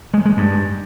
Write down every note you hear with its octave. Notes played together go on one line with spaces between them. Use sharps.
G#3
G#3
G2